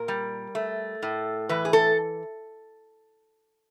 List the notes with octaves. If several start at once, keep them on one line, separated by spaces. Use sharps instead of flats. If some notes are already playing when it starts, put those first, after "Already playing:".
Already playing: A#2 A#4
G3
A3
A2
E3 B4
G#4
A4